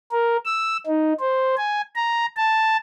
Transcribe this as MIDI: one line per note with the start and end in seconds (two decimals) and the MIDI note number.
0.12 0.37 70
0.45 0.77 88
0.87 1.13 63
1.19 1.55 72
1.57 1.81 80
1.96 2.26 82
2.37 2.77 81